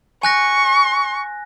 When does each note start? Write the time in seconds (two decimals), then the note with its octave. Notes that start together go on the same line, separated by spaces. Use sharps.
0.23 G#5 C#6 F#6 A#6